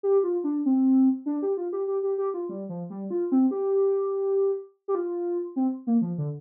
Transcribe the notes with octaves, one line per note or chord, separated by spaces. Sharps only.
G4
F4
D4
C4
D4
G4
F4
G4
G4
G4
G4
F4
G3
F3
G3
F4
C4
G4
G4
F4
C4
A#3
F3
D3